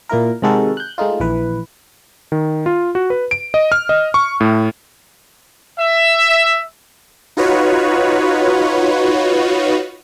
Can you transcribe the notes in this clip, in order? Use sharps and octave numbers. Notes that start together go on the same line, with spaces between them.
A#2 A#3 E4 A#4
C3 D#3 G#3 F#4 A4 A#4
F#6 G6
G#3 A3 D#4 F4
A#1 E3 B4
D#3
F4
F#4
B4
D7
D#5
F6
D#5
C#6
A2
E5
D#4 F4 F#4 B4 C#5